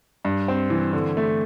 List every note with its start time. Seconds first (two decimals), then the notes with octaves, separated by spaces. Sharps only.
0.25 G2
0.48 C4
0.70 E3
0.93 D3
1.17 A3